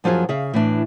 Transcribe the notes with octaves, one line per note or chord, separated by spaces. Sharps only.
F#2 F3 F#3 F4 G#4
C#3 G#4 E5 F5
A2 E3 D4